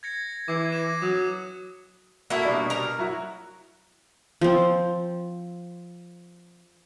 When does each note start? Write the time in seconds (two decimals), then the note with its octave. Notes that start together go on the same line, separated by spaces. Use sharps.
0.03 G#6 A#6 C#7
0.48 E3 D6 G#6 C7
0.72 A#6 E7
1.02 F#3 D6 D#6
2.30 A#3 E4 F#4 A4 E5 F#5
2.45 B2 G3 D4
2.70 A#4 A#5
2.98 F#3 E4 F#4
4.41 F3 C4